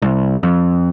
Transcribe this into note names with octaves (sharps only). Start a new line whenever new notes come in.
C2
F2